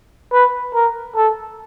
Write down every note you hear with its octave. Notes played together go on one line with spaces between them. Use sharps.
B4
A#4
A4